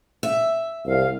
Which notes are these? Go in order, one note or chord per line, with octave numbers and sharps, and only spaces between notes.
E5
C2 F5